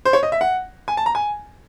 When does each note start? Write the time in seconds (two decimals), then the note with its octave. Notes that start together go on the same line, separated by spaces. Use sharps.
0.05 C5
0.13 C#5
0.23 D#5
0.32 E5
0.41 F#5
0.88 G#5
0.97 A5
1.06 A#5
1.15 G#5